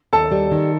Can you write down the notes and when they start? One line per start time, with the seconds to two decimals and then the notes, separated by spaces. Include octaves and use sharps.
0.13 D#2 A4 A5
0.32 G3
0.51 D#3